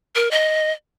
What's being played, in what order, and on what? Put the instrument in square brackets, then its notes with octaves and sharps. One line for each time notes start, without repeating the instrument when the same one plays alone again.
[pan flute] A#4
D#5